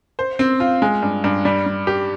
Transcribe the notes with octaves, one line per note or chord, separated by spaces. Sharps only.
C5
C4
F4
G#3
G2
G2
G3
G3
G4